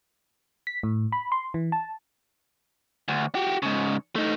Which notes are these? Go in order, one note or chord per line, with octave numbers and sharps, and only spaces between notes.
B6
A2
B5
C6
E3
A5
D2
F#4 G4
G#2 C#3
A3 D#4